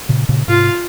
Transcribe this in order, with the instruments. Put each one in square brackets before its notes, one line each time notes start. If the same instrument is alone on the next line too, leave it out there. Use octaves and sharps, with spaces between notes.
[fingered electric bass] A#2 C#3
A#2 C#3
[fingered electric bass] G#2 C3 [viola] F4